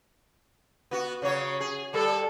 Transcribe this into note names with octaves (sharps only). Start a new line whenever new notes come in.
B3 F#4
C#3 F#3 C#5
G#4
G3 A4